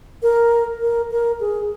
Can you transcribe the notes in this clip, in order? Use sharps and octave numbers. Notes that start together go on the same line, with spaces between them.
A#4
A#4
A#4
G#4